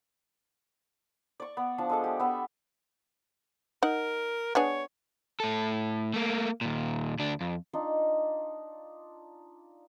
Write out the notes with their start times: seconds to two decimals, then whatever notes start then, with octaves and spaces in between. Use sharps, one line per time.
1.40 D5 C#6
1.57 B3
1.78 F3 D4 A5
1.90 G#3 A4 D5
2.04 G4
2.20 B3 E5
3.83 D#4 A#4 F#5
4.55 B3 D4 G#4 C#5
5.40 A2 A4
6.14 A3 A#3
6.61 D#2 A#2
7.19 D2 D4
7.41 F2
7.73 D4 D#4 F4